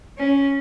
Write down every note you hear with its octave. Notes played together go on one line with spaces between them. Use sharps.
C#4